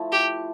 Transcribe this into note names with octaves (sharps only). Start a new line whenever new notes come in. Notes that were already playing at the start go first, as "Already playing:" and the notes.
Already playing: F3 A3 E4
G4